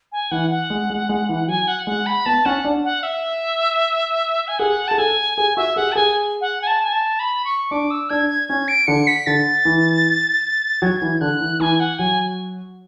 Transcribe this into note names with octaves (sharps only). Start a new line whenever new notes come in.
G#5
E3 F#5
F#5
G#3
G#3
G#3
E3
F#3 G#5
F#5
G#3 F#5
B5
B3 A5
C#4 F#5
D4
F#5
E5
G#5
G#4 F#5
G#4 A5
A4 G#5
G#4 G#5
F#4 E5
G#4 F#5
A5
G#4 G#5
F#5
G#5
A5
G#5
A5
B5
C#6
D4 D6
E6
D4 G#6
G#6
C#4 G#6
D7
D3 C#7
B6
D3 A6
E3
F#3 G#6
E3
D3 F#6
E3
E3 G#5
F#5
F#3 G#5